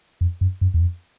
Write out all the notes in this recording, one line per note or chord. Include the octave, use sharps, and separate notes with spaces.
F2
F#2
F#2
E2
F2